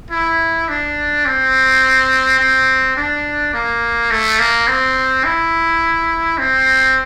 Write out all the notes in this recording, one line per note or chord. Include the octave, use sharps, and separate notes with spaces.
E4
D4
C4
C4
D4
A#3
A3
A#3
C4
E4
C4